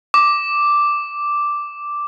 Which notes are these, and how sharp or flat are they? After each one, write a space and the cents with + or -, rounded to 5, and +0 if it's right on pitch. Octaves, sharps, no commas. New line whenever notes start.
D6 +0